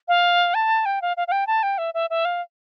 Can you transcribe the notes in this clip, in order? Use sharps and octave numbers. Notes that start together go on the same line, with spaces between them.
F5
A5
G5
F5
F5
F5
G5
A5
G5
E5
E5
E5
F5